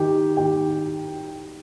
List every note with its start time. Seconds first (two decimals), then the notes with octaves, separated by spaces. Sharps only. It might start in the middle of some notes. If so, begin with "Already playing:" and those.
Already playing: D#3 G4 G5
0.37 D#3 G4 G5